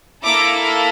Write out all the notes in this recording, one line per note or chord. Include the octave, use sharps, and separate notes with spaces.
A#3 E4 A4 A#5 D6